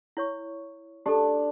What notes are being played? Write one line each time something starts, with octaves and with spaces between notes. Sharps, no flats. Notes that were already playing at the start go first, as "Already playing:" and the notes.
E4 C#5 C#6
D4 G4 A4